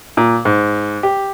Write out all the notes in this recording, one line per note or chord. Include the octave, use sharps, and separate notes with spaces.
A#2
G#2
G4